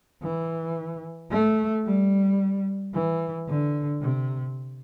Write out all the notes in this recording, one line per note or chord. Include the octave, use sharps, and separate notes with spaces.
E3
A3
G3
E3
D3
C3